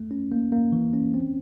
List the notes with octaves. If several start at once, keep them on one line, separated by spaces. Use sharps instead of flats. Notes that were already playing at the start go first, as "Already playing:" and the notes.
Already playing: A3
C#4
A#3
A#3
E3
C#4
C4